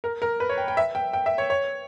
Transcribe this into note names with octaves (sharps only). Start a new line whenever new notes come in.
A#4
A#4
B4
C#5
G5
G5
E5
G5
G5
E5
C#5
C#5